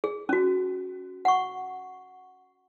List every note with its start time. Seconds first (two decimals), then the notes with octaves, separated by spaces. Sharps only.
0.04 G#4
0.29 C#4 F#4
1.25 F#5 C#6